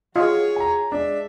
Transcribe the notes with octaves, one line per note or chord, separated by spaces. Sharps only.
F4 F#4 G#4 C#5 D#5
G#5 A#5
G#3 D4 E5